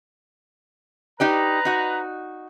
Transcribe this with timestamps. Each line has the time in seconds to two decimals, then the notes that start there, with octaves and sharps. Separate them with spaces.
1.20 D#4 G4 B4 D5 A#5
1.65 D#4 F#4